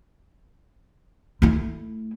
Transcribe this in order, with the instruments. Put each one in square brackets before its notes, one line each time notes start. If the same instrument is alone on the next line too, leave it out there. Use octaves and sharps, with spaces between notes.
[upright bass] A3 E4